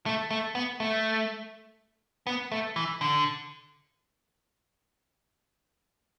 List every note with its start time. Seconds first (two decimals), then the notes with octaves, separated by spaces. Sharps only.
0.06 A3
0.30 A3
0.55 B3
0.80 A3
2.27 B3
2.52 A3
2.76 E3
3.01 D3